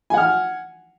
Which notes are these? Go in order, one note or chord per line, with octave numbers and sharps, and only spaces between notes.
F#5 G#5 F6